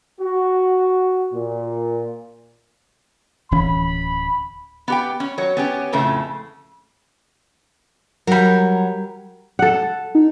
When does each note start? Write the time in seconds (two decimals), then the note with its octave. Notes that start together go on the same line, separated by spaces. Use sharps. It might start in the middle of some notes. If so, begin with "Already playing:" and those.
0.20 F#4
1.32 A#2
3.51 D1 E3 C#4 B5
4.88 B3 G4 G5
5.20 C#4
5.38 F#3 C#5
5.57 B3 C#4 G4
5.93 F2 A2 C#3 A3
8.27 F#3 G3 A#4
9.59 A4 F#5
10.15 D#4